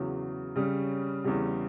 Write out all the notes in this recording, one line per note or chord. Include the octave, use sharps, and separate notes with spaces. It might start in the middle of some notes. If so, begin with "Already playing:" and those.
Already playing: E2 C#3 F#3
C#3 G3 C#4
E2 C#3 G3